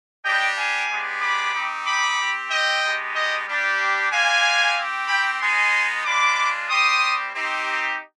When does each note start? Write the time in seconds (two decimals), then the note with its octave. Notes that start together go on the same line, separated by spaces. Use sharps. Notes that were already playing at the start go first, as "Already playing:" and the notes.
0.25 G3 D4 G4 D#5 G5
0.57 F5 G#5
0.90 G#3 B3 D4 G4
1.22 B5 D6
1.54 C4 D#4 G4
1.86 B5 D6
2.19 C4 G4
2.51 D#5 G5
2.83 G#3 B3 D#4 G4
3.15 D#5 G5
3.47 G3 D4 G4
4.12 G#3 D4 G4 F5 G#5
4.77 C4 G4
5.08 G5 B5
5.41 G#3 B3 D#4 G#5 C6
6.05 G#3 D4 F4 B5 D6
6.69 G3 C4 G4 C6 D#6
7.34 C4 D#4 G4